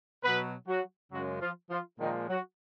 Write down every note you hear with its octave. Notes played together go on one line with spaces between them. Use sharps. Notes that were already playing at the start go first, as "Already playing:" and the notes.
B2 F#3 B3 B4
F#3 F#4
F#2 C#3 F#3 G#3 F#4
F3 F4
F3 F4
A#2 D#3 F3 G#3 D#4
F#3 F#4